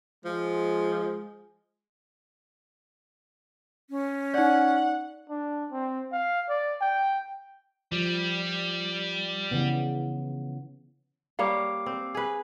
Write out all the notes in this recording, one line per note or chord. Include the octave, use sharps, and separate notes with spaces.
F3 G#3
C#4
D#4 D5 F#5
D4
C4
F5
D5
G5
F3 G3
C#3 E3 B3
G3 A#3 C#5 F5 D6
C4
G#4 B4